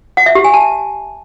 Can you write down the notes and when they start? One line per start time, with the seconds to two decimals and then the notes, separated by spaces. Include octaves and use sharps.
0.17 F#5
0.26 E5
0.35 G4
0.44 G#5
0.54 A5